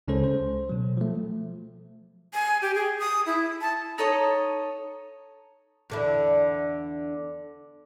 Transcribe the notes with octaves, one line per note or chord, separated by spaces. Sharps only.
C#2 C#3 G#3 C#4 A4 C5
C5
B2 F#3
F3 A3
G#5
G4
G#4
D#6
E4
A5
D#4 A4 C#5 D#5
E2 D3 E4